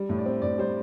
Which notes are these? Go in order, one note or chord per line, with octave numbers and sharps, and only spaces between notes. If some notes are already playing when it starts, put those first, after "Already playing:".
Already playing: G3
A2
D5
C4
A2 D5
G3 C5